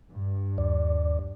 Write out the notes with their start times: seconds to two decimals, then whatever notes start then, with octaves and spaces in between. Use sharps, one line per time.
0.11 G2
0.58 D#2 D5